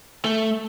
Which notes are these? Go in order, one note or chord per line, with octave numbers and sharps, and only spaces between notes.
A3